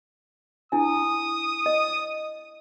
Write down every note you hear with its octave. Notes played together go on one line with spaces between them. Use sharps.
D4 E4 G#5 D#6
D#5